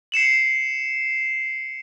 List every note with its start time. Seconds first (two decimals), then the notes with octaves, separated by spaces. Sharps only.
0.12 C7 C#7 E7 F#7